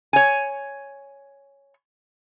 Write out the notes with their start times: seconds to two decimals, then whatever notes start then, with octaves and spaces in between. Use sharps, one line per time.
0.13 C#5 G#5